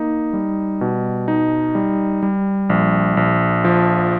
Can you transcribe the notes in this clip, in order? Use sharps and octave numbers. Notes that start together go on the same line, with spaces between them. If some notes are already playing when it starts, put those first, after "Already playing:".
Already playing: A#3 D#4
G3
B2
D#4
G3
G3
A#1
A#1
F3